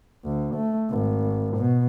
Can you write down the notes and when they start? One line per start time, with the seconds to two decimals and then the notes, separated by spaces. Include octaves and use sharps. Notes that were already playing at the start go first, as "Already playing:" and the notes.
0.24 D2
0.55 A3
0.91 G#1
1.57 B2